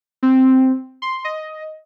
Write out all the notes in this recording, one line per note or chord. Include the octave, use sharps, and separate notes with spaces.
C4
C6
D#5